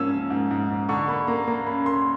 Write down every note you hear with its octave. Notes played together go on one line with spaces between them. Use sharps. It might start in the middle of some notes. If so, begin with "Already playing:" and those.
Already playing: G#2 F3 A#3 C#4 E6
C#4
G#2
G#2
G#2
D3 C#6
A#3 B5
A#3 A#5
A#3 A#5
C#4 B5
A#3 C6